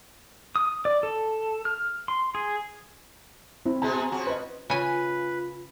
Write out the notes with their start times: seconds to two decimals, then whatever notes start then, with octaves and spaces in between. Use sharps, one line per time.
0.56 D#6
0.85 D5
1.03 A4
1.65 F6
2.08 C6
2.35 G#4
3.66 C4 E4
3.82 B2 G#3 G#4 A5 A#5
4.10 C#3 F3 F#4
4.27 B4 D#5
4.70 C#3 F4 B4 G#5